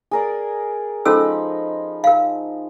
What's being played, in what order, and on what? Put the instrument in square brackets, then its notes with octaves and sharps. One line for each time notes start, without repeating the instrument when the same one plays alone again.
[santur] G#4 A#4 D5
[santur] F3 D#4 B5 [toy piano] C#4 A4 E6
[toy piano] A#4 F5